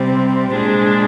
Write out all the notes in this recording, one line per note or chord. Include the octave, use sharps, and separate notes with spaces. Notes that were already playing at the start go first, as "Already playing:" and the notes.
Already playing: C3 G3 C4
A#2 G#3 D4